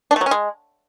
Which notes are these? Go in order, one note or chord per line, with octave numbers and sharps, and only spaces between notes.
D4
A3
F#3
C#4
G#3